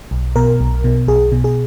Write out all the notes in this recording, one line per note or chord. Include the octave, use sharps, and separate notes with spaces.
B1
B2 A#4
B1
B2
B1 G#4
B2
G#4